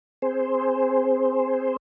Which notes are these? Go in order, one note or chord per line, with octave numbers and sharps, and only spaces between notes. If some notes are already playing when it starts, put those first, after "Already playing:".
C4 G#4 C5